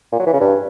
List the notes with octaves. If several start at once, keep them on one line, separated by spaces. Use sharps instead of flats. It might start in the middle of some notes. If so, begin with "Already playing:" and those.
A#2
F#3
E3
C#3
G2